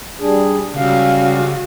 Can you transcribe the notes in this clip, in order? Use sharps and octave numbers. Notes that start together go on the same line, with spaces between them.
G3 D4 G#4
C#2 G3 C#4 F#4 F5